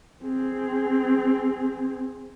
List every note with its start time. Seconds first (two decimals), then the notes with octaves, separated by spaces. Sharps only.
0.25 C4 G#4